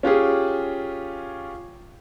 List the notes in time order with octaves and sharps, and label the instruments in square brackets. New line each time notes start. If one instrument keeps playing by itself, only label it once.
[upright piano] C#4 F4 G4 G#4